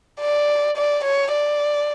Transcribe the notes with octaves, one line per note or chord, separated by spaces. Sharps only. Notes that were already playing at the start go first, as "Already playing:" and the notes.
D5
D5
C#5
D5